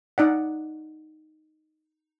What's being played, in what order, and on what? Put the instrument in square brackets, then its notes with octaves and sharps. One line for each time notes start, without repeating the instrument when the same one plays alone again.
[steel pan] D#4 D5 F#5